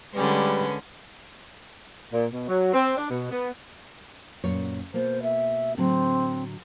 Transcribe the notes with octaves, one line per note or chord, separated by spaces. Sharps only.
D3 G3 G#3 C#4 B4
A#2
B2
F#3
C4
D4
B2
B3
F#2 A#2 C#5
B2 A#3 C5
E5
A2 D3 F#3 C4